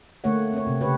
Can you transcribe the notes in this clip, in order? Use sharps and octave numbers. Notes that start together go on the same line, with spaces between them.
D3 A3 A#3 C#5 F#5
C4 C#5
C3
C#3 G4 B4 C#5